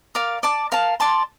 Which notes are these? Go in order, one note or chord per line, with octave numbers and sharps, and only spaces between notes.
A#4 D5 F5
D5 A5 D6
A#4 F5 A5
D5 A5 C6